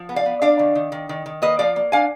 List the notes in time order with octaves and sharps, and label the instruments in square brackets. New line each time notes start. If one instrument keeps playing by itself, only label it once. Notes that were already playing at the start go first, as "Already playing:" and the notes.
Already playing: [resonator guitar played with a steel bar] F3
B3
D5 F5
B3
D4 D5 F5
D#3
D#3
D#3
D#3
D#3
A#3 B4 D#5
F3 D5 F5
A#3
D4 F5 G#5